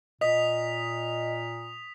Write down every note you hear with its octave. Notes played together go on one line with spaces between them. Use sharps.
A#2 D#5 D#6 B6 F7